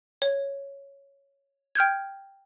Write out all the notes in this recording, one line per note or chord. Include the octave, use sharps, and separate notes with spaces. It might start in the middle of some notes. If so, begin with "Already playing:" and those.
C#5
G5 F6 G6 G#6